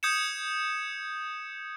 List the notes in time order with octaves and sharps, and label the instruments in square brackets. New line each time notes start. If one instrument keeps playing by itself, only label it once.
[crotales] D#6 G6 G#6 C#7 E7